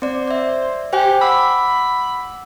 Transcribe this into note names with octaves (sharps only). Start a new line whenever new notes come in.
C4 C5 D5
D5 E5
G4 C5 G5 G#5
F#5 B5 D6 E6